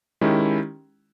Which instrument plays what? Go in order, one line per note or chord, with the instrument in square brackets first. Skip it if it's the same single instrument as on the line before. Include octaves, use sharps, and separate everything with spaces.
[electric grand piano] D#3 G#3 C#4 E4 G4